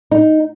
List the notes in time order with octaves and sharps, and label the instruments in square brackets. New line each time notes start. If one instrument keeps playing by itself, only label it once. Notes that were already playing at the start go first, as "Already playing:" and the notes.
[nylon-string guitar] D#4